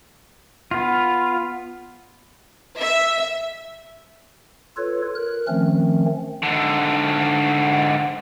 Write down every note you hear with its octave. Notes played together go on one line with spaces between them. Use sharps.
B3 F4
E5
F4 A4 B4 C#5
A#4 F#6
D#3 F3 A3 C4 C#4
G#2 D3